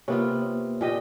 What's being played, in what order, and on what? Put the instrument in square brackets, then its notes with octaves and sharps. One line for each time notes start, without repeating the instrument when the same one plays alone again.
[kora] C3 B3 F4 [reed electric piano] A#3 C#5
[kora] A#2 G4 D#5